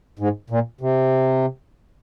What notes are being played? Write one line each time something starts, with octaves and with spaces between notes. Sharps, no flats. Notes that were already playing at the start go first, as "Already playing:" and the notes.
G#2
A#2
C3